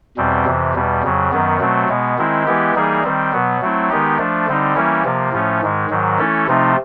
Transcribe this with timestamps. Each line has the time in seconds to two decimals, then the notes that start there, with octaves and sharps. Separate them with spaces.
0.17 E2 B2 G3 C4
0.46 F2 C3 E3
0.74 E2 B2 G3
1.03 F2 C#3 F#3
1.31 F#2 D#3 F#3 B3
1.60 B2 F#3 A3 C4
1.89 B2 G#3 B3
2.18 D#3 G#3 C4 E4
2.46 E3 G#3 B3 E4 G4
2.76 E3 G3 A#3 D#4 G#4
3.04 D#3 G3 C4
3.32 B2 F#3 B3
3.61 F#3 A3 C4 E4
3.90 D#3 G#3 B3 D#4 G4
4.19 F3 A3 D4
4.47 D3 G3 C4 D#4
4.76 E3 G3 A#3 C#4 E4
5.05 C3 F3 A#3
5.32 A2 F3 A3 C#4
5.62 G#2 D#3 G#3
5.90 G#2 D#3 F#3
6.18 E3 A3 C#4 E4 A4
6.47 C3 F3 A3 C4 D#4